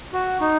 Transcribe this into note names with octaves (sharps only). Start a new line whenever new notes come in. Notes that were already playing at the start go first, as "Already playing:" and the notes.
F#4
D#4